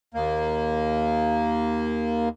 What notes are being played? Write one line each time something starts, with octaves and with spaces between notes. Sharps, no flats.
D#2 A#3